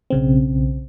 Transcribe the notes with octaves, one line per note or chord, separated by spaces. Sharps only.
B1 C#3 C4